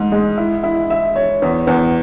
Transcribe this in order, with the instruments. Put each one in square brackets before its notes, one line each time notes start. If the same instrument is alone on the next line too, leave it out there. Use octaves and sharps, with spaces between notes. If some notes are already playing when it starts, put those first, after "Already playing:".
Already playing: [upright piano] G#2
G#3
E4
E4
E5
C#5
E2
E2